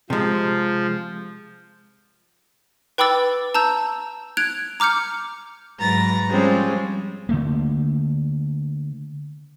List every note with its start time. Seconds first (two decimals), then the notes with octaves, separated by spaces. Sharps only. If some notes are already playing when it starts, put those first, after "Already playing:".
0.10 C3 F3 G#3
2.98 B4 G5 B5 D6 E6 A6
3.55 A5 A#5 E6 G6
4.37 F#6 G#6 D7 F7
4.80 A#5 D6 F6 G6 C#7
5.78 G#2 F#3 B4 A#5 A6 A#6
6.28 F3 G3 G#3 C4 C#4
7.29 D3 A3 A#3